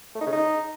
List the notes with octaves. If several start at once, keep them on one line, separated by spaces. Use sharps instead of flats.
A3
D#4
C#3
D#4